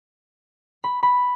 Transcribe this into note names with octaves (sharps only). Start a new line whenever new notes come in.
B5
B5